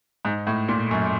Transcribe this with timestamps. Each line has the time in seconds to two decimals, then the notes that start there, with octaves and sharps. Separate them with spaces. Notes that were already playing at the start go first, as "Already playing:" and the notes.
0.25 G#2
0.47 A2
0.69 A#2
0.91 F#2